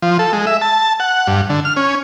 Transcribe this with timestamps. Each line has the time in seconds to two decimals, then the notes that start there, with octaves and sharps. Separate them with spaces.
0.02 F3
0.19 A4
0.33 G#3
0.47 E5
0.61 A5
1.00 F#5
1.27 G2
1.50 D3
1.65 F6
1.77 C#4